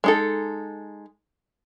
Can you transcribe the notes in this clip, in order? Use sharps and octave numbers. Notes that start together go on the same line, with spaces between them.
G#3 D#4 A4